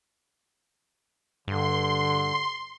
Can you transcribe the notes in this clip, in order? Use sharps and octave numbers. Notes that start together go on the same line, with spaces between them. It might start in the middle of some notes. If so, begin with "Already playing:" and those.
G2 D3 C6